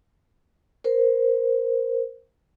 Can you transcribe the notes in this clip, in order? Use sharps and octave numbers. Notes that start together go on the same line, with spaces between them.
A#4 C5